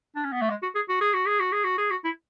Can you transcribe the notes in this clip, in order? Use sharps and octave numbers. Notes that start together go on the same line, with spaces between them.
D4
C#4
B3
A3
G#3
F#4
G#4
F#4
G#4
F#4
G#4
F#4
G#4
F#4
G#4
F#4
E4